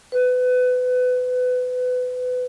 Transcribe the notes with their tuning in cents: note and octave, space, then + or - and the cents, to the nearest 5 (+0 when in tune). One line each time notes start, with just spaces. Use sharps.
B4 +25